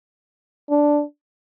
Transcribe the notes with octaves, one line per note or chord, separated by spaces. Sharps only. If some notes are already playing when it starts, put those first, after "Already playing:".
D4